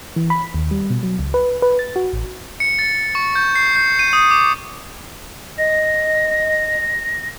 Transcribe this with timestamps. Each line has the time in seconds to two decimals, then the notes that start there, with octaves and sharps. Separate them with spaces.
0.16 E3
0.30 B5
0.54 D#2
0.71 G3
0.90 B2
1.03 F#3
1.19 C#2
1.34 B4
1.62 B4
1.79 A6
1.96 F#4
2.13 A1
2.60 C#7
2.79 A6
3.15 C#6
3.35 G6
3.55 C7
3.75 G6
3.99 D#7
4.13 D#6
4.31 D6
5.58 D#5 A#6